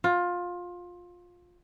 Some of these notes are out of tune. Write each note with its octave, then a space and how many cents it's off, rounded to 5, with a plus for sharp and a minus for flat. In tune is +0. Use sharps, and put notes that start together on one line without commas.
F4 +20